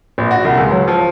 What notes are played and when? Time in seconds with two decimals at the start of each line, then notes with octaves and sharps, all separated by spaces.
0.18 A#1
0.31 F#4
0.45 C2
0.57 C#2
0.71 F#3
0.88 F3